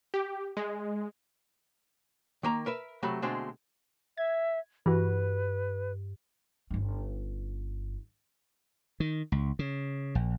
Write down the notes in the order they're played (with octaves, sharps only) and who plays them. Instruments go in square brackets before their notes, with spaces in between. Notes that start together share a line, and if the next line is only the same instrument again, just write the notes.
[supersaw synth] G4
G#3
[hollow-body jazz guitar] D#3 A#3 A#5
A#4 B4 E5
C3 F#3 A3 B5
B2 D3 G#3 A3 C4
[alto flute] E5 [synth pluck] G#6
[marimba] G2 [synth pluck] E3 F#4 [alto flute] B4
[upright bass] G1 C#4
[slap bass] D#3
C#2
C#3
A#1